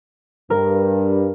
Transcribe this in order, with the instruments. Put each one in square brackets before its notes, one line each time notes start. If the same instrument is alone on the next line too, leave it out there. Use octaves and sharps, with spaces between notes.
[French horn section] G2 [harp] A#4